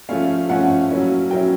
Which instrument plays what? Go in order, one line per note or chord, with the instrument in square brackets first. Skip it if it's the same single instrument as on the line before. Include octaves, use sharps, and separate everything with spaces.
[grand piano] F3 A3 C#4 F5
F3 A3 C#4 F#5
F#3 A#3 C#4 E4
F#3 A#3 C#4 E4 G5